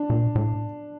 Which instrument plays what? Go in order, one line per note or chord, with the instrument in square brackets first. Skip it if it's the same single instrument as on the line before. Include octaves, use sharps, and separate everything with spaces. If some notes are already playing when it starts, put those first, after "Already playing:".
Already playing: [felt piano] D4
[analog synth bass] A#2
A2